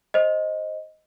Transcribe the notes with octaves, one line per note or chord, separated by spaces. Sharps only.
C5 D#5